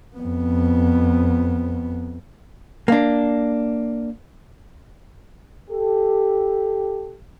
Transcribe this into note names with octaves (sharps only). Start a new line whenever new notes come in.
F2 B3
A#3 D4
G4 A4